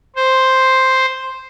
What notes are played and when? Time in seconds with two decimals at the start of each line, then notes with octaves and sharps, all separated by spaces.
0.16 C5